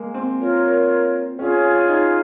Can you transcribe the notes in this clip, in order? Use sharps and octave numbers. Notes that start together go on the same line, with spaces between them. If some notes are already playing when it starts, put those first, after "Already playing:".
Already playing: G#3 A#3
C4
F4 A#4 C#5
C#4 F4 G#4 C#5
D#4